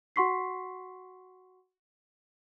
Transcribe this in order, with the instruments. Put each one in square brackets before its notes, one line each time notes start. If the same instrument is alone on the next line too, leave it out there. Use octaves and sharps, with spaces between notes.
[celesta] F#4 F#5 C6 C#6 B6 C7